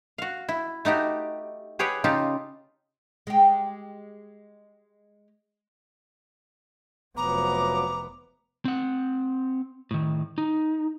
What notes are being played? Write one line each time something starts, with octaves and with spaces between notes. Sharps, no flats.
F#4 F5
E4
A3 D#4 F#4 G4
G4 G#4 B4 C#5 F#5 G5
C#3 D#4 F4 G4 A5
G#3 G4
F1 F3 F#3 B3 A#5 D6
C4 F#5
A2 D#3
D#4